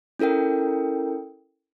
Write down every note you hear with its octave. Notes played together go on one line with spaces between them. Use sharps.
C#4 E4 A4 A#4 G5